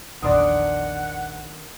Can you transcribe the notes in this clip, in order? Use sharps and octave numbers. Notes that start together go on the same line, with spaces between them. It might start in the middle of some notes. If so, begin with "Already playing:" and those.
A#1 E2 D#3 D4 D5 F#5 C6 D#6